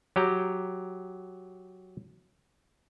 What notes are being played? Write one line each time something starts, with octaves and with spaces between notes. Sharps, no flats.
F#3 G4 G5 A#5